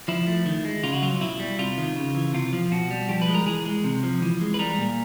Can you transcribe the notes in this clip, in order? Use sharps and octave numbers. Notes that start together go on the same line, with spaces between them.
F3 E4
A3
D#3
G#3
C#3 F4
F#4
F#3 F4
B2 E4
G3
C3 F4
D#3
C#3
E3
C3 F4
F3
B2 F#4
G3
F3 G4
B4
G#3
A#4
E3 G#4
G#3
C3
F3
E3
G#3
B4
G3 A#4
A#2